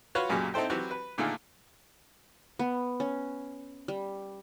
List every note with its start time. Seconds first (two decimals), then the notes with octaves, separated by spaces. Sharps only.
0.15 F4 F#4 B4 C#5
0.29 B1 F#2 A#2 C#3 G4 G#5
0.54 C4 D#4 E4 A4 C5 G5
0.70 E3 F#3 C4 F#4 G4 B4
0.91 B4
1.18 A#2 D3 D#3 A3 F4 G#4
2.59 B3
3.00 C#4
3.88 G3